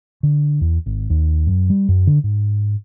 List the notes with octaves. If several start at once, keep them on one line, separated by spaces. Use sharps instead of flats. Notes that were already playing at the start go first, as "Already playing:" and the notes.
D3
E2
G#1
D#2
F#2
G3
F#2
D3
G#2